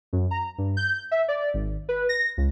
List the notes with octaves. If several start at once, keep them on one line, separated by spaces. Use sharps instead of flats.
F#2
A#5
G2
G6
E5
D5
G#1
B4
A#6
C#2